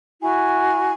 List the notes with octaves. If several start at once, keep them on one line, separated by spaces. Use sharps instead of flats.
E4 F#4 G#5